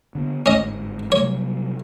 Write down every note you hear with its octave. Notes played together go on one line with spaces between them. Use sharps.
D3 B3
G1 G#2 C#4 D#5
C3 F#3 G3 C#5